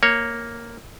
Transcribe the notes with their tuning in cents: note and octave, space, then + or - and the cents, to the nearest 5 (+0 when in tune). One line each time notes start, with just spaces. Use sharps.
A#3 +0 C#5 +0